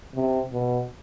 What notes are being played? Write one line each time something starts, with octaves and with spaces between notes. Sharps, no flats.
C3
B2